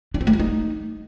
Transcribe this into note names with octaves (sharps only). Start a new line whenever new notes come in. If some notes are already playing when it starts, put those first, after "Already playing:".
D4
C4
A3
E4
D#4